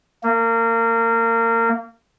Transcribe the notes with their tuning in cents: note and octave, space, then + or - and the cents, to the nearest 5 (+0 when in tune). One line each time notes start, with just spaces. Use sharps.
A#3 -30